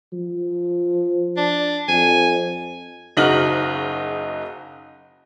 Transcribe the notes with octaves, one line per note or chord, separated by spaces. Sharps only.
F3
D4
F2 G#5
F#1 C#3 D#4 F#4 F6 F#7